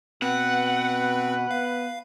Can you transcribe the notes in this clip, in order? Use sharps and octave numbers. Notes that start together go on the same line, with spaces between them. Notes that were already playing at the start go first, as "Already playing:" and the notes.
B2 C4 B4 F#5
B3 F5